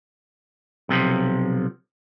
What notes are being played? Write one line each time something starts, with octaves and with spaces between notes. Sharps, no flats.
B1 C3 F3